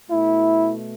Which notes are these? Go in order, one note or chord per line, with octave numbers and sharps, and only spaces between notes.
B2 A3 E4